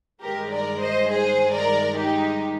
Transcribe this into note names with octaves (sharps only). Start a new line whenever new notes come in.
G2 D#3 G#3 G4 A#4
A#4 D5
C5 D#5
G#4 C5
A#4 D5
D#4 G4